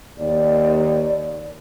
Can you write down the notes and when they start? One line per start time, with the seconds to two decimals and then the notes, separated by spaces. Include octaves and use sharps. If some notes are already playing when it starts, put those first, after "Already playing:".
0.18 D#2 D5